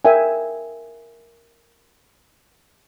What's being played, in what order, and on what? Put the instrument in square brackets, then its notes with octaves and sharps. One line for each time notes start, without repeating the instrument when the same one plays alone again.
[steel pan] A#4 E5 G5 G#5